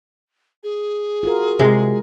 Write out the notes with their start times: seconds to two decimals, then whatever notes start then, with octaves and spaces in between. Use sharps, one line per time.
0.64 G#4
1.23 F4 F#4 A#4
1.59 C3 G#3